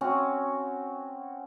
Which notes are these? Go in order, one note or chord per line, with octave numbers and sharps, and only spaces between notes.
C4 C#4 F#4